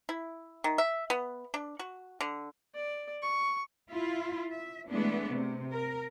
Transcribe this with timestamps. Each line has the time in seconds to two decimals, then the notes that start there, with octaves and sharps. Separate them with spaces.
0.09 E4
0.64 D#3
0.78 E5
1.10 B3
1.54 D4
1.79 F#4
2.21 D3
2.75 D5
3.22 C#6
3.91 E4 F4
4.50 E5
4.89 E3 G#3 A3 B3 D4
5.30 C3
5.73 A#4